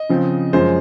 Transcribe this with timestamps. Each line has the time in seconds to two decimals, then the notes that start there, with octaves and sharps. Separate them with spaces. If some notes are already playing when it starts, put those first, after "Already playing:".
Already playing: D#5
0.09 C#3 F3 C4
0.53 F#2 F3 G#3 C5